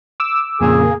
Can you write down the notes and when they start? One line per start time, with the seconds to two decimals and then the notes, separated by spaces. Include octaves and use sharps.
0.20 D6 E6
0.61 F2 A#2 C#3 A#3 G#4